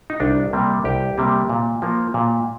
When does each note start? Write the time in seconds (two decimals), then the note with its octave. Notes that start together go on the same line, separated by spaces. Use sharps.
0.10 D#4
0.20 C2 D4
0.53 C3 G3 A#3
0.84 C2 G4
1.18 C3 G3 A#3
1.49 A#2
1.82 F3 A#3
2.14 A#2